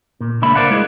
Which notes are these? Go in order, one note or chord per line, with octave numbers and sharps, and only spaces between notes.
A#2
C#2 A#3 D4 E5 B5
A#4 C5 D5 F5 F#5
G#3 E4 G#4 D#5